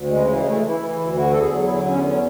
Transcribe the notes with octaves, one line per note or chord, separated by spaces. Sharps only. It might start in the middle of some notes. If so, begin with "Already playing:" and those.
Already playing: D2
C#3 G#3
E3
E3 A3
E3
E4
E3
E4
D2
D3 F#4
E2 A4
G#4
F#3
E4
D3
E2 C#4
F#3 C#4